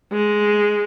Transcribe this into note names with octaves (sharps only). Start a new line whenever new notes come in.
G#3